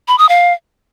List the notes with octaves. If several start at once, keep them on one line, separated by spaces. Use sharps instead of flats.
B5
D#6
F5